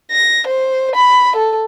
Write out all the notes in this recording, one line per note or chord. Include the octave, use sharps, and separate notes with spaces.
A#6
C5
B5
A4